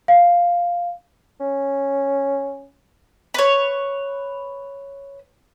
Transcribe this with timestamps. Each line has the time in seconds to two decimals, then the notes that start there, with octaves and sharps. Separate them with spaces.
0.08 F5
1.40 C#4
3.34 B4 C#5